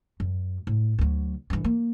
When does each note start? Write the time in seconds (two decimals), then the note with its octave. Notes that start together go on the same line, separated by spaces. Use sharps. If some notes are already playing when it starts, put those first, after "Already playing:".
0.20 F#2
0.67 A2
0.99 D2 F#3
1.50 G2 E3
1.64 A#3